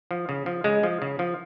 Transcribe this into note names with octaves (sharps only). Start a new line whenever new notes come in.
F3
C#3
F3
C#3 G#3
F3
C#3
F3